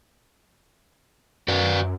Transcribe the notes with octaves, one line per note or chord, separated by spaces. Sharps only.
F#2 F#4 B4 D5